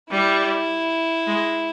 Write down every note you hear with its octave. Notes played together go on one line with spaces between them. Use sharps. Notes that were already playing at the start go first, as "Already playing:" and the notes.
G3 E4
G#3